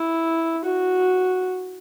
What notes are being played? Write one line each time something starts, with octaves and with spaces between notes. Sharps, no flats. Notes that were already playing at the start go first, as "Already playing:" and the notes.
Already playing: E4
F#4